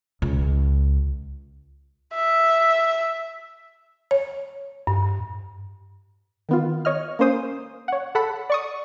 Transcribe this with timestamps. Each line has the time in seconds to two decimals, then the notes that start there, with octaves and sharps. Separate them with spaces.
0.22 C#2
2.15 E5
4.11 C#5
4.87 G2
6.49 D#3 B3 F4
6.85 C#5 D#5 F6
7.19 A#3 C#4 C5 D#6
7.88 C#5 F#5
8.15 A4 F#5 B5
8.50 D5 C#6 D#6